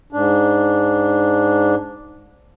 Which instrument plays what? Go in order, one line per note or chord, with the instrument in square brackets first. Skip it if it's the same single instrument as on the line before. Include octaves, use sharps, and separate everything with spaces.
[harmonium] G#2 D4